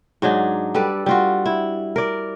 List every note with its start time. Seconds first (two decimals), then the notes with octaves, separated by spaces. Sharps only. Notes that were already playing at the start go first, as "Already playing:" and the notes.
0.22 G#2 F#3 D4 D#4
0.75 G3 A4 B4 D5
1.06 G3 F4 F#4
1.46 E4
1.96 A#4 D5